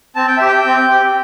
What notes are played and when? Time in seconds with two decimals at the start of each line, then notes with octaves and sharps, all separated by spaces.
0.16 C4 A5
0.27 G5
0.38 G4 E5
0.48 G5
0.66 C4
0.91 G4